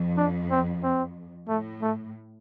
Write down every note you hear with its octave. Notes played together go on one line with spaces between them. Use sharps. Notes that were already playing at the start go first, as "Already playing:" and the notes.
Already playing: F2
D4
C4
C4
A2 A3
A3